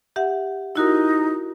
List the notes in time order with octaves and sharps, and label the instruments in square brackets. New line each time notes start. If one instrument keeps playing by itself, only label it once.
[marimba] G4 E5 F#5
[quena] D#4 [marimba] E4 F#4 A#4